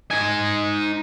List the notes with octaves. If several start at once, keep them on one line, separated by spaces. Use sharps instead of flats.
D#4 G#5